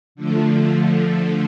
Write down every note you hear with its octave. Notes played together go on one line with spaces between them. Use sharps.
D3 F3 A3